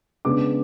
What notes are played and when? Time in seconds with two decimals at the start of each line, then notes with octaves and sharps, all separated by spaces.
0.25 C#3 G#3 B3 D4 D6